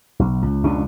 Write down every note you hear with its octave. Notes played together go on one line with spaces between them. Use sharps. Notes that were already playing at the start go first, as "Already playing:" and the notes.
B1
C#2
F1 C#2 B2 D4